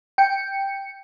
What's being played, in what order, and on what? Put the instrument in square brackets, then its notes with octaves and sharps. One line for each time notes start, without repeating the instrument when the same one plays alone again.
[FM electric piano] G5 C#7